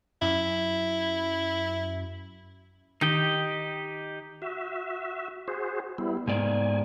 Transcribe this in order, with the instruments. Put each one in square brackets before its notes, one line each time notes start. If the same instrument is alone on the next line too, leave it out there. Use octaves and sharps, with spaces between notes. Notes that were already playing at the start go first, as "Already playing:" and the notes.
[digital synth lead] F#2 [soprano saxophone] E4
[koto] D#3 [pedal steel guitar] D#4 G4 D#5
[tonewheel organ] F#4 E5
F#4 G#4 C5
G3 B3 E4
[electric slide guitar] G#2 B3 D5 [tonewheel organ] G#5